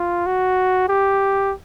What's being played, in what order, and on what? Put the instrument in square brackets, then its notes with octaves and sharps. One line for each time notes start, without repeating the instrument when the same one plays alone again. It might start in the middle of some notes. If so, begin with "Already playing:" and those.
Already playing: [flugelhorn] F4
F#4
G4